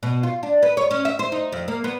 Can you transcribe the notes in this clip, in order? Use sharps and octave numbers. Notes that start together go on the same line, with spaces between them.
B2
F4
D4
B4
C#5
C#4
E5
C5
D#4
F2
A#3
B3